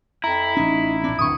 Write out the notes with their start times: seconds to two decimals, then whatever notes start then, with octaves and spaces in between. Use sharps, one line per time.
0.24 F2 E4 A#5
0.57 A1 C#4 D#4
1.04 A#1 C4 D4
1.19 D1 G2 C#6 D#6